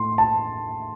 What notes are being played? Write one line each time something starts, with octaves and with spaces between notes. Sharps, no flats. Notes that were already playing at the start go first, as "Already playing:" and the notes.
Already playing: A2 A3 C6
A5